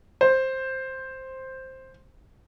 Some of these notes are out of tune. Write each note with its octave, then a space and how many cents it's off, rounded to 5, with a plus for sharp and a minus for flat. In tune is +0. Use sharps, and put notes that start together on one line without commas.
C5 +5